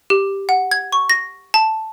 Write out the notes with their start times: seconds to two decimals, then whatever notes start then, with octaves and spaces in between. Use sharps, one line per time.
0.10 G4
0.49 F#5
0.71 G#6
0.92 C#6
1.10 A#6
1.54 A5